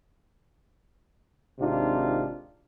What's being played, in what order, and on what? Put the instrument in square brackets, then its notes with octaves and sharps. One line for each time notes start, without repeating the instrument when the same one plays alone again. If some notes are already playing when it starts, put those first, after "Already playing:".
[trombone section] G#1 C3 D4 D#4 F4